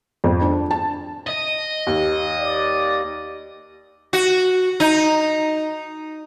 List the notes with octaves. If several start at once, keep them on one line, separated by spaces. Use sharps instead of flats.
F2
D4
A5
D#5
D#2
D5
F#4
D#4